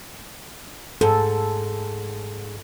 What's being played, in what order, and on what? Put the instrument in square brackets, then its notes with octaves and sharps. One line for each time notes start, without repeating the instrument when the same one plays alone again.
[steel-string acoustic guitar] G#2 [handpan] A4